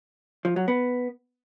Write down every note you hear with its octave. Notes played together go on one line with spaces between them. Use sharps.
F3
F#3
B3